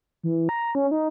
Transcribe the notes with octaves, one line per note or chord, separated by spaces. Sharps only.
E3
A#5
C#4
D#4